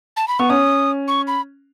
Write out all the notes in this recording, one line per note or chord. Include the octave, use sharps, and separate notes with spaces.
A5
B5
B3 C#6
C#4 D#6
C#6
B5